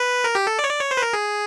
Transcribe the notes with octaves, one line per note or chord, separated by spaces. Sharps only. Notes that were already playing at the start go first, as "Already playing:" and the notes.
Already playing: B4
A#4
G4
A4
D5
C#5
D5
C#5
C5
B4
A#4
G#4